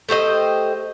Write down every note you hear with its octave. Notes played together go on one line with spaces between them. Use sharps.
A3 G4 C5 D#5